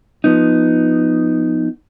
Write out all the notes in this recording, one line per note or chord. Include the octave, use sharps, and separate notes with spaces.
F3 B3 D#4